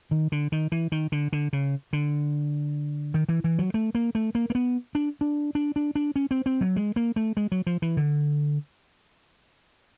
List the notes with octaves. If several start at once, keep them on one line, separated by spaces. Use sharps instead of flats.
D#3
D3
D#3
E3
D#3
D3
D3
C#3
D3
D#3
E3
E3
F#3
A3
A#3
A3
A#3
A#3
B3
D4
D4
D4
D4
D4
C#4
C4
C4
F#3
G#3
A#3
A3
G#3
F#3
F3
E3
D3